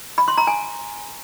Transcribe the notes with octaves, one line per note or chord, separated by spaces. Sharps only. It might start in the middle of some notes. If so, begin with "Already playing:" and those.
B5
C6
A#5
G#5